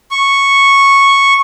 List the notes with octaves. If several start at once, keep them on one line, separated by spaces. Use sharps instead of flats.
C#6